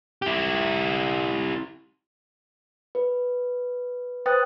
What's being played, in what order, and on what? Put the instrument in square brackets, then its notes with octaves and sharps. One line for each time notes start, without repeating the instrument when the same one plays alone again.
[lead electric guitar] E4 G4
[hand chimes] B4
B4 C5 G5 D#6 F#6 A6